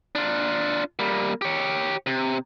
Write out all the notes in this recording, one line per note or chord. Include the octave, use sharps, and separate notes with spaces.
D4 F4
G3 A#3
G4 C#5
C3